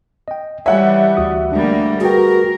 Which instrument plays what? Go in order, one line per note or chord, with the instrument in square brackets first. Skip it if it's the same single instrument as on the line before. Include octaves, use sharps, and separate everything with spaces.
[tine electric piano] D#5 G5
[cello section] E3 G3 [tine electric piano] C#5 G#5 [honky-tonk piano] E5 F#5
[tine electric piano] D2 F#4 D#6
[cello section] D2 G3 A#3 [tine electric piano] D4
[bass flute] F#4 [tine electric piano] G#4 B4 G5 [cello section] A#4